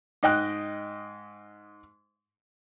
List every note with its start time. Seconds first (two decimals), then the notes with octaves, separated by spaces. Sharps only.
0.23 G#2 D#5 G5 F#6